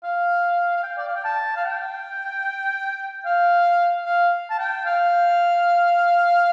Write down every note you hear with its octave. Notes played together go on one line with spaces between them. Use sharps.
F5
F5
G5
D5
F5
G5
A5
F5
G5
F5
F5
A5
G5
F5